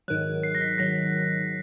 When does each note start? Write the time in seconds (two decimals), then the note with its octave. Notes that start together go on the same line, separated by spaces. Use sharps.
0.08 G#2 D#3 F#3 F#6
0.43 C7
0.55 A#6
0.61 B6
0.78 G#2 D#3 F#3 A#6